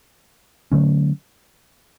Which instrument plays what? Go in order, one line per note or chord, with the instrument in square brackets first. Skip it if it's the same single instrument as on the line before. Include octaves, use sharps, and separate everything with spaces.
[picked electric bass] D3 F#3 A3 C#4